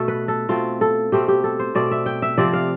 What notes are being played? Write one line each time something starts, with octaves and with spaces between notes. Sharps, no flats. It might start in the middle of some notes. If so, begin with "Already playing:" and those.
Already playing: B2 A3 A4
B4
A4
B2 A3 C4 F4
A4
B2 A3 C4 G4
G4
A4
C5
B2 A3 C4 D5
E5
G5
E5
C3 F3 C4 D5
F5